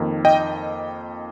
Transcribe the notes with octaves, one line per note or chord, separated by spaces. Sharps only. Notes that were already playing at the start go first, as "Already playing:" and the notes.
Already playing: F2 D#3 A#3
D#5 G5